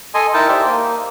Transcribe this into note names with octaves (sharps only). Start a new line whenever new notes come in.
A4 D#5 G#5 C6
D#4 E4 A#4 G5 A5
G4 C5 D5 E5
A#3